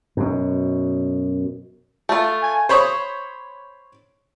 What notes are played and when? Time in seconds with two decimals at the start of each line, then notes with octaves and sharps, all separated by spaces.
0.17 F#2 B2
2.09 A3 F4
2.43 G#5
2.69 C5 C#5 B5 C#6 D#6